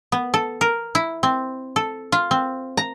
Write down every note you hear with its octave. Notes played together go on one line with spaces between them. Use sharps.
B3
A4
A#4
E4
C4
A4
F4
C4
A#5